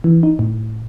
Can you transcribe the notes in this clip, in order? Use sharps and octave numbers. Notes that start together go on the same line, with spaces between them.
E3
D#4
A2